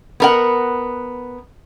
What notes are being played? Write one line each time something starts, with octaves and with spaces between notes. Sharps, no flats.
B3 A#4 F#5